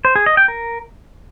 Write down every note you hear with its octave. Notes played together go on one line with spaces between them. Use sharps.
C5
G#4
D#5
G5
A#4